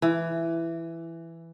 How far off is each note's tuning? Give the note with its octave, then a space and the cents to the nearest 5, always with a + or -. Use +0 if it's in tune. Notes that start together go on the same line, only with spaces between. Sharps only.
E3 +10